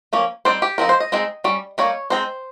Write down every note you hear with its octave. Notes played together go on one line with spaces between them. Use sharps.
F3 A#3 C#4
G3 C4 D#4 C5
G4
F3 C4 D#4 A#4
C5
D#5
G#3 C4 D#4
G3 C#4
G3 A#3 D#4 C#5
G#3 C4 D#4 C5